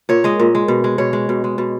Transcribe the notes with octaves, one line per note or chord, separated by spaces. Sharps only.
A#2 C#5
G#3 D#5
A#2
G#3
B2
G#3
B2 C#5
G#3
B2
G#3
B2